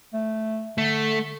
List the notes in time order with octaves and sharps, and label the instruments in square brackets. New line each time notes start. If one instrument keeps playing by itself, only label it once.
[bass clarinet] A3
[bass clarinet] D3 [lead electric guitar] A3